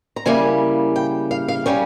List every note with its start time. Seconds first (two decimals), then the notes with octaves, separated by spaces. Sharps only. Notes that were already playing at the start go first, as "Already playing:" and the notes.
0.16 A#5
0.26 C#3 G3 A#3 E4 G#5
0.96 G5
1.31 F5
1.48 F5
1.66 C#3 G3 C#4 G5